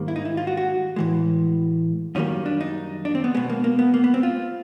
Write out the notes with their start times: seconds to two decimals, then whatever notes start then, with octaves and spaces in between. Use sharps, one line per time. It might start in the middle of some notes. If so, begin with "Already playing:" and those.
Already playing: G#2 D#3 G3 A#3
0.08 E4
0.16 D#4
0.25 E4
0.37 F4
0.47 F#4
0.57 F#4
0.96 A2 E3 G#3
2.15 F#2 D#3 G3 A#3 C#4
2.46 D4
2.61 D#4
3.05 D4
3.15 C4
3.24 B3
3.34 B2 G#3 B3
3.50 A#3
3.64 A#3
3.79 B3
3.94 A#3
4.04 B3
4.14 C4
4.23 F4